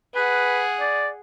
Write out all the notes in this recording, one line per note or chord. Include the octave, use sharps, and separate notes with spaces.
G#4 B4 F#5
D5